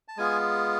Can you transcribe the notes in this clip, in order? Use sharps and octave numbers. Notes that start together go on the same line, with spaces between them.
A5
G#3 B3 F4 G#4 G#5